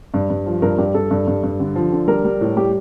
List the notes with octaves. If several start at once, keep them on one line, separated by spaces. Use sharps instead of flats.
G2
G2
F3
G2 A#4
G2 G4
G2 A4
G2
G2
G2
D3
F3
D3
G3 A#4
G3
A2
G3 G4